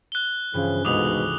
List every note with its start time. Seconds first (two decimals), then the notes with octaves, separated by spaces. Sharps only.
0.12 F#6 G7
0.54 G2 C#3 E3 F3
0.85 F1 C#2 G#2 B2 D6 D#6 F7